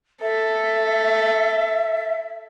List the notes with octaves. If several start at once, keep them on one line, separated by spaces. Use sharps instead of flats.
A4 E5